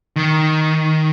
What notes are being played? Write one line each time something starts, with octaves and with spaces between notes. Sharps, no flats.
D#3